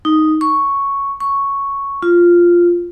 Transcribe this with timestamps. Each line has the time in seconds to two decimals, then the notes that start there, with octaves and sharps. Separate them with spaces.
0.05 D#4
0.41 C#6
1.20 C#6
2.03 F4